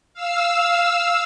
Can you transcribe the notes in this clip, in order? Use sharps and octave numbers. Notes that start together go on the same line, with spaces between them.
F5 E6